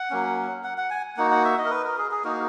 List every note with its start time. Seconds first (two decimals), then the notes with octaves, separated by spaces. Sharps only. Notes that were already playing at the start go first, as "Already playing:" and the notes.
Already playing: F#5
0.10 F#3 A#3 C#4
0.64 F#5
0.78 F#5
0.90 G#5
1.17 A#3 D#4 F#4 F#5
1.31 F#5
1.45 E5
1.58 D#5
1.65 A#4
1.70 B4
1.84 A#4
1.98 G#4
2.11 G#4
2.24 A#3 D#4 F#4 A#4